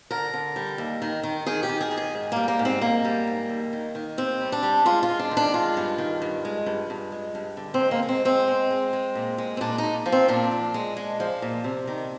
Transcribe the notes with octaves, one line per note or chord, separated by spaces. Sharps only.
D3 A#4
D3
G3
D#2
D#3
D#3
D#3 G#4
G4
D#3
G#4
D#3
G#4
G#2
G3 A#3
A#3
G#2
C4
G#2 A#3
G3
G#2
D#2
D#3
D#3
D#2 C4
G3
D4
G3
G#3 F4
F4
G#3
D4
D#3
D4
G#3 F4
G2
D#3
G2
G#3
G2
G2
G#3
G2
D3
C4
G#3
A#3
G#3
C4
G#3 C4
G#3
G#3
G#3
A#2
G#3
C4
A#2 D4
D#4
A#2
F3
C4
A#2 D4
A#2
G#3
G#3
F3
A#2
C3
D#3